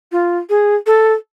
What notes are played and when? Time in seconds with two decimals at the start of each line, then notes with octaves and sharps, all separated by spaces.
0.12 F4
0.49 G#4
0.86 A4